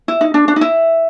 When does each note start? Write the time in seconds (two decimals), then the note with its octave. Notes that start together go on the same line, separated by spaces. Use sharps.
0.08 E4
0.21 D#4
0.34 D4
0.48 D4
0.56 D#4
0.61 E4